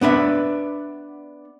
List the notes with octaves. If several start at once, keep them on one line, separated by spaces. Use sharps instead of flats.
B3 D4 B4 E5